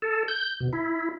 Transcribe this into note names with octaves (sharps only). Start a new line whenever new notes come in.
A4
G6
B2
E4